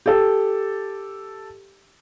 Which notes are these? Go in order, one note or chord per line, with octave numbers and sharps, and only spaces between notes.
G4 A4